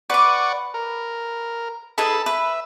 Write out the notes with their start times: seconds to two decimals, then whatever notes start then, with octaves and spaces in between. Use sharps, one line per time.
0.10 B4 D5 F#5 C#6 D6
0.74 A#4
1.98 D#4 G#4 A4 B4 A5 B5
2.26 B4 E5